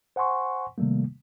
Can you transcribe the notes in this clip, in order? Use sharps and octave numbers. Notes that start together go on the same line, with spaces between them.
C5 F#5 G#5 C6 C#6
C3 D#3 G3 A3 A#3